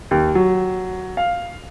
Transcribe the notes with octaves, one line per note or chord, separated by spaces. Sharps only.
D#2
F#3
F5